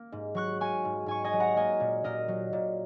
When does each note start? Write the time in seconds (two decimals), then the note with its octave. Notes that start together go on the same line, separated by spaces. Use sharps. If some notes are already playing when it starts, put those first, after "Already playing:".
Already playing: A#3
0.12 G#2
0.35 F#3 C#6 F#6
0.61 A#3 G#5 C#6
0.85 G#2
1.06 G#2 G#5 C#6
1.24 D#5 G#5
1.33 F#3
1.40 F#5 A#5
1.56 A#3 D#5 G#5
1.80 A#2
2.04 A#2 A#4 D#5
2.28 F#3
2.53 A#2